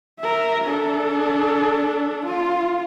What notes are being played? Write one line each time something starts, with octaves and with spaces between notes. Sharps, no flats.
A#4 E5
D4 A4
F4